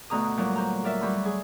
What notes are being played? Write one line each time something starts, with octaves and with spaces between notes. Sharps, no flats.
D2 B2 A#5 D#6
A#2 F#3 G3
C5 A#5
A#4 D5 E5
F#3 G3 B5
G#4